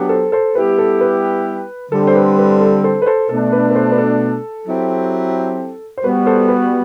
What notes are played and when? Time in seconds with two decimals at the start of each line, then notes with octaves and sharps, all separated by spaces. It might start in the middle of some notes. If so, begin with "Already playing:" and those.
Already playing: F#3 B3 D4 G4
0.09 A4 C5
0.32 A4 C5
0.55 G3 B3 E4 G4 B4
0.78 A4
1.01 B4
1.92 D3 G3 C4 A4
2.07 C5
2.16 B4
2.39 B4
2.61 A4
2.84 A4 C5
3.02 B4
3.06 A4 C5
3.29 B2 A3 D4 A4
3.52 B4
3.70 B4
3.75 A4 C5
3.92 B4
3.98 A4
4.66 F#3 C4 E4 G4
5.98 C5
6.03 G3 B3 F#4 B4
6.26 A4 C5
6.49 B4